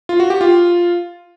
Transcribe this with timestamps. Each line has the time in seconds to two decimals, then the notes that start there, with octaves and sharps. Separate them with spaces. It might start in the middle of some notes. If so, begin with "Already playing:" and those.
0.09 F4
0.20 F#4
0.30 G4
0.41 F4